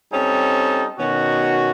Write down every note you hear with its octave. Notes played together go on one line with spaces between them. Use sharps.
G3 C4 C#4 D#4 A4
B2 D#3 C#4 F#4